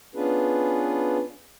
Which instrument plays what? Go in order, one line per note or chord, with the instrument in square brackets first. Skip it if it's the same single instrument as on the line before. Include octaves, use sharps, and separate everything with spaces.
[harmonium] B3 C#4 D4 F4 G#4 B4